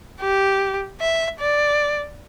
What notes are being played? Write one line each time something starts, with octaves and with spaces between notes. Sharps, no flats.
G4
E5
D5